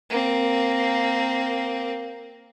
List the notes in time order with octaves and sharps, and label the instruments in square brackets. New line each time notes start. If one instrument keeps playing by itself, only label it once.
[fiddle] A#3 C4